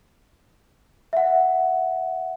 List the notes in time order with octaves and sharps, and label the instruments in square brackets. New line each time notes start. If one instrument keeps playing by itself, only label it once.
[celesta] E5 F#5